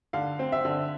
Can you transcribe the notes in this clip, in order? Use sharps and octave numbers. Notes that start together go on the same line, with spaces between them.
D3 F5
C4
E5
D3